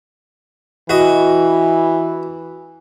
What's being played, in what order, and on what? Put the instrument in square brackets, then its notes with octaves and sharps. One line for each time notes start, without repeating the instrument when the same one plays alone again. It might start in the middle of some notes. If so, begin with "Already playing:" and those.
[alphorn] E3 [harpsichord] F#4 D#5